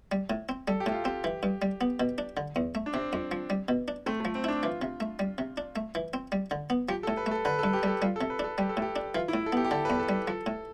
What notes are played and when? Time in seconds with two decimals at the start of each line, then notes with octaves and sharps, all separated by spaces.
0.12 G3
0.30 A2
0.49 C4
0.68 G3 A4
0.80 G4
0.86 A2
0.92 F4
1.04 C4 G4
1.24 E3
1.43 G2
1.62 G3
1.81 B3
2.00 B2
2.18 D4
2.37 D3
2.56 E2
2.75 A3
2.86 D4
2.93 C3 C4
3.13 F2
3.31 F3
3.50 G3
3.68 B2
3.88 D4
4.06 A3 C4
4.20 A3
4.25 F3
4.35 C4
4.44 D4 E4
4.63 E3 F4
4.82 C3
5.00 A3
5.19 G3
5.38 C3
5.57 D4
5.76 A3
5.95 E3
6.14 C4
6.32 G3
6.51 D3
6.70 B3
6.88 F3 G4
7.03 A4
7.08 A2
7.17 B4
7.26 A3
7.31 A4
7.45 D3 B4
7.59 A4
7.64 G2
7.73 G4
7.83 G3 A4
8.01 G3 F4
8.16 A4
8.21 C3
8.30 B4
8.39 D4 A4
8.58 G3 G4
8.69 A4
8.77 A2 G4
8.96 D4
9.15 E3 F4
9.28 E4
9.34 A2
9.46 A4
9.52 B3 G4
9.65 G4
9.71 D3 A4
9.85 B4
9.90 E2
10.00 A4
10.09 G3
10.28 F3 A4
10.46 A2